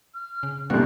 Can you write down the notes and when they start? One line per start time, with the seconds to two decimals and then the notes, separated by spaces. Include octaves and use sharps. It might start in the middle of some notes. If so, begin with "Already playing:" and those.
0.14 F6
0.43 C#3
0.70 G1 C2 A#2 G3 F#6